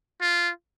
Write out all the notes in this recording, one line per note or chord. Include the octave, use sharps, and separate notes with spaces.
F4